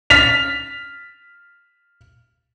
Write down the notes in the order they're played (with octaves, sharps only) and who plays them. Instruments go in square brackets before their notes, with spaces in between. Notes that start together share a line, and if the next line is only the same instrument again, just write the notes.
[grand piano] F6 A6 B6 F7